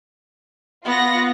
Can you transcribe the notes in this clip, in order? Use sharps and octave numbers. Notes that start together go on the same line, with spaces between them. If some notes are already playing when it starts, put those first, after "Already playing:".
B3 F4 F#5 A#6